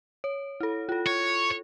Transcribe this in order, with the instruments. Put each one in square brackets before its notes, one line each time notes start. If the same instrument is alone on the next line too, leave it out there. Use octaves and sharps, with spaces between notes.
[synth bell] C#5
E4 A4
F4 A4
[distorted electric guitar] C#5